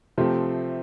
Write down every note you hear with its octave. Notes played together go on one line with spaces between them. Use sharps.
C3 F3 A3 C4 G4